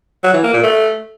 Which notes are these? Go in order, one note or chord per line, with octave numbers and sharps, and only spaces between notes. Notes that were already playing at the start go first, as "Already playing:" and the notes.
F#3
E3
A#3
A#2
A3